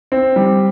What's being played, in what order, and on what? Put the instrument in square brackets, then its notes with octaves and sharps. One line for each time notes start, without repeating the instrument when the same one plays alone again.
[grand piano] C4
G3